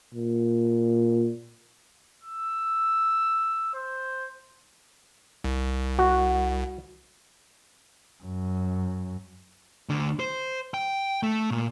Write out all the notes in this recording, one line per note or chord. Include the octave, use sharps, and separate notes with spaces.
A#2
E6
C5
C2
F#4
F#2
D2 D3
C5
G5
A3
A#2